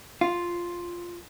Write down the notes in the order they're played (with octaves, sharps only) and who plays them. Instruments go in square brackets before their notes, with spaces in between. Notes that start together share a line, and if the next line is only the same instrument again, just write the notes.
[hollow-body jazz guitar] F4